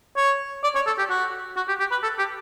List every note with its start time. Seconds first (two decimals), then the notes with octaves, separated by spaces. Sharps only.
0.17 C#5
0.64 D5
0.75 C#5
0.87 A4
0.98 G4
1.10 F#4
1.56 F#4
1.68 G4
1.79 G4
1.91 B4
2.03 A4
2.18 G4